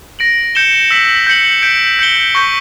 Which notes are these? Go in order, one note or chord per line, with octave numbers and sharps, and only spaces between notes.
A#6 D7 F#7
G6 C#7 E7 G7
E6 B6 F#7
G6 C#7 F#7
G6 B6 D7
G6 C#7 G7
C#6 G6 B6 D7